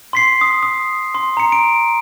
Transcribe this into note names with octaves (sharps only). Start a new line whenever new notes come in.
C6 B6 C7
D#6
D#6
C6
A#5 C#7
D7